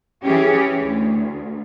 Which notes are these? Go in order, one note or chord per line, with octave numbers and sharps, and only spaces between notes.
E3 C#4 G4 G#4
D2